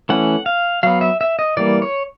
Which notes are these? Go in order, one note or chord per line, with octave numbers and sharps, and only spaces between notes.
E3 A3 C#4 F#5
F5
F#3 B3 F5
E5
E5
D#5
E3 G3 A#3 D5
C#5